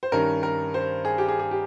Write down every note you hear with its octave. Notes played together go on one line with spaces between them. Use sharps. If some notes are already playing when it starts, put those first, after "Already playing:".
C5
G2 D#3 G3 C#4 A#4
A#4
C5
G#4
G4
G#4
G#4
G4